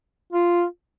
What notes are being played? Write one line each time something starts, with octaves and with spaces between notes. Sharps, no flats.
F4